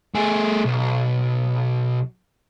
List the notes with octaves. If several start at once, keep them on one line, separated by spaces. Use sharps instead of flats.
A3 G#4
B1